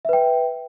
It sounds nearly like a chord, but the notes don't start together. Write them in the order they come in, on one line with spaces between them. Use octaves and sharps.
E5 B4 G5